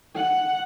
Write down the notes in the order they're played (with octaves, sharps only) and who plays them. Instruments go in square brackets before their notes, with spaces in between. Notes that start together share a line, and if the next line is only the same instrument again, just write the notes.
[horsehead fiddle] F#5